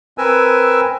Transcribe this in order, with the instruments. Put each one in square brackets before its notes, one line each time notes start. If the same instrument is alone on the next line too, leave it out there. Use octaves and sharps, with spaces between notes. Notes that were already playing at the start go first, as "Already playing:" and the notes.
[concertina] C4 A#4 B4 G#5 E6